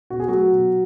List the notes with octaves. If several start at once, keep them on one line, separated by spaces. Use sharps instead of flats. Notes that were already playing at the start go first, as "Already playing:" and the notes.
B2 F#4
G#4
F#3 A3 F#4
B2